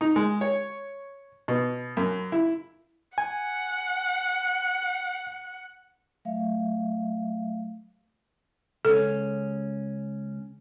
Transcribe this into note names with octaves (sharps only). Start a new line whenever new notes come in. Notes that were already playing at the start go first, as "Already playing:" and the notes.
D#4
G#3
C#5
B2
F#2
E4
F#5 G#5
F#3 A3 E5 F5
C#2 C#4 A4